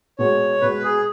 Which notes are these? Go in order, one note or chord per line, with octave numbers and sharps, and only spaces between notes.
B2 G#3 B3 C#5
B2 G#3 B3 B4
G#4